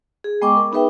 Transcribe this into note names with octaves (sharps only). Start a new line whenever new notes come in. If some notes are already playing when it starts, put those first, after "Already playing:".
G#4
G#3 B3 D#5 G5 C#6 D6
A#4
B3 D#4 G#4 B4 E5 G5